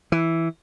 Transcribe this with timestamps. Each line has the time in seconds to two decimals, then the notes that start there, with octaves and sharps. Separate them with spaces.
0.12 E3